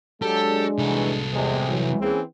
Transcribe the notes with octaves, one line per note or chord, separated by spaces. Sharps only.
F#3 G#3 D4 G4 A4
C2 E3 F#3 A4
E2 C3 G#3
E3 F#3
E3 A#3 C4 C#4 G#4